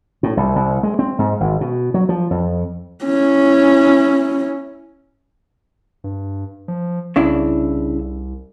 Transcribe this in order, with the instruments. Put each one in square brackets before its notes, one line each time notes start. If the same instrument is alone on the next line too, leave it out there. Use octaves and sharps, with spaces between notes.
[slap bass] A2
C2
C2
G#3
C4
G#2
G#1
B2
F#3
F3
F2
[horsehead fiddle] C#4 E4
[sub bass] G2
F3
[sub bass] C2 [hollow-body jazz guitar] C#3 D4 E4